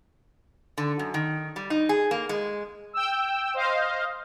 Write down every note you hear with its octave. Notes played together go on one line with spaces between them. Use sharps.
D3
F#2
D#3
G3
D#4
G#4
A#3
G#3
G5 E6
C5 D#5 F5